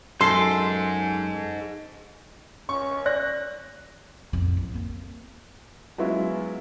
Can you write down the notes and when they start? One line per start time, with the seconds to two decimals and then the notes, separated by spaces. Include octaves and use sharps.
0.21 F#2 D#4 G#4 A4 C6
2.69 C#4 C#6
3.06 D5 F#6 A#6
4.33 F2 A2
4.57 A1
4.74 A#3 C4
5.98 F#3 G#3 B3 C#4 E4 F4